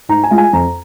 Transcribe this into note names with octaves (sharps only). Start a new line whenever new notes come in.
G#2 A#5
G#5
G#3 F4
G#5
F2 A#5